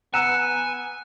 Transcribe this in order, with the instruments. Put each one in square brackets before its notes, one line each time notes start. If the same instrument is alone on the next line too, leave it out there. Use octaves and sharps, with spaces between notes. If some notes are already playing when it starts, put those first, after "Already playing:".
[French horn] B3 [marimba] F#5 A#5 E6 [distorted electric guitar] G#5 [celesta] F#6 C#7 E7